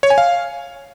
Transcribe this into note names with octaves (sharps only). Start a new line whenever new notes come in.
C#5
G#5
F5